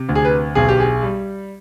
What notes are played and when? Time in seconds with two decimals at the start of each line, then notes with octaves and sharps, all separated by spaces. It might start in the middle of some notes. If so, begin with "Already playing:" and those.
Already playing: C3
0.09 D2
0.15 G#4
0.25 B4
0.55 B1 G#4
0.69 G4
0.80 G#4
1.03 G3